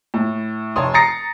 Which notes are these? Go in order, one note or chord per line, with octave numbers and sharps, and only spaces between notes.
A2
F1 C#5 A5 C6 D#6
A#5 D#6 A6 A#6 C7 C#7